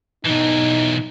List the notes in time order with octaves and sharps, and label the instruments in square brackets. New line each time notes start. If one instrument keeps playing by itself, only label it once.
[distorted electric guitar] B1 E3 [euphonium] D#4